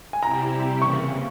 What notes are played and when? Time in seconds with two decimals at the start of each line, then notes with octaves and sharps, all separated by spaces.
0.13 G#5
0.22 C3 G3 C4 E4 G4 A#5
0.81 C#3 E3 A#3 C#6